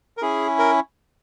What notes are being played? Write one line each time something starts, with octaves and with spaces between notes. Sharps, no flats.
A#4
C#4 E4 G#4
A#4